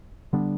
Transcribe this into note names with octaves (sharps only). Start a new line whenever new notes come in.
D3 G3 B3 D4